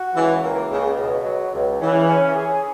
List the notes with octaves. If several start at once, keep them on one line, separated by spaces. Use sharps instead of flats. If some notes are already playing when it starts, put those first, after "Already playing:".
Already playing: F#4
C#2 E3
A#3
C#2 C#3
B2
F#3
C#2
C#3 E3
C#4
G#4